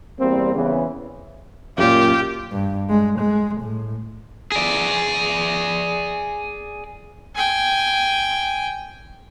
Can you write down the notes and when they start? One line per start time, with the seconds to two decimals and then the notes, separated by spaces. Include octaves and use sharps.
0.19 E2 G3 A#3 C4
0.54 E2 C#3 E3 B3 C#4
1.78 F#2 A#2 F4 G4
2.52 G2
2.89 G#3
3.19 G#3
3.61 A2
4.52 G#4 D5
7.35 G5 G#5